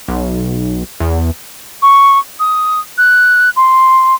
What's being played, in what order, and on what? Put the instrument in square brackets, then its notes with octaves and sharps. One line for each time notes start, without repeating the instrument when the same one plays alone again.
[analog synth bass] B1
E2
[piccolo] C#6
D#6
F#6
C6